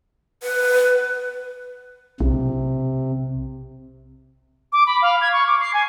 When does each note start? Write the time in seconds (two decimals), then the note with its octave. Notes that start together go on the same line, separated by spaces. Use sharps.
0.43 B4
2.21 B1 C3
4.73 D6
4.87 B5
5.02 F5
5.21 G#6
5.33 C#6
5.47 D6
5.61 C7
5.74 G#5